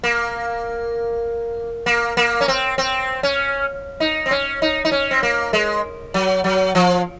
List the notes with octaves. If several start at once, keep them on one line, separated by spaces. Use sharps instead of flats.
A#3
A#3
A#3
C#4
C4
C4
C#4
D#4
C4
C#4
D#4
D#4
C#4
C4
A#3
G#3
F#3
F#3
F3